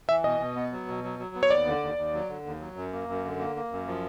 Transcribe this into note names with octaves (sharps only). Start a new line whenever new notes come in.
E3 E5
B2 D#5
B2
B3
F#3
B2
F#3
F#3
B3
C#5
D#2 D5
D3
D#2
D#2
F#3
D3
D#2
F#3
F#2
A#3
F#2
D3
A#3
A#3
F#2
F3